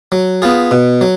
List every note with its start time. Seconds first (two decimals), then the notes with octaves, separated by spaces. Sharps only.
0.12 F#3
0.42 B3 F4 G#4
0.71 B2
1.01 F#3